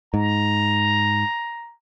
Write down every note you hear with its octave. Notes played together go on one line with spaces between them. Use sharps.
G#2 A#5